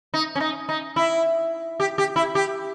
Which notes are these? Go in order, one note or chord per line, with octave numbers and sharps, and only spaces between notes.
D#4
C#4
D#4
D#4
E4
G4
G4
E4
G4